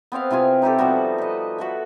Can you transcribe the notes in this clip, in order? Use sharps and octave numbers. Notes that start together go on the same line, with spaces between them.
B3 C4 D#5 F5
C3 E4 F4 G#5
D#4 E4 G4 A4
F3 G3 B3 F#4
B4 D#5
F#4 A4 E5